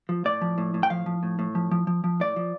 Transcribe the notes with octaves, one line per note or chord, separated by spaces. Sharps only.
F3
A2 D5
F3
A2
A2
G5
F3 F5
F3
A2
A2
F3
F3
F3
F3
A2 D5
F3